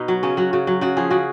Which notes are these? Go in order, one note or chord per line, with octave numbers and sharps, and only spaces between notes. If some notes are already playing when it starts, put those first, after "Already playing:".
Already playing: B2 D#4
F#3
C#3 C#4
F#3 F#4
C#3 F#4
F#3
C#3 F#4
F3 G#4
C#3 F#4